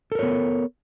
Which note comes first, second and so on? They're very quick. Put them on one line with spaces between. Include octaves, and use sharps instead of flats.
A4 A#4 C#5 B3